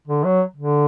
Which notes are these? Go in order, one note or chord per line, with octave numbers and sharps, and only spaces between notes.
D3
F#3
D3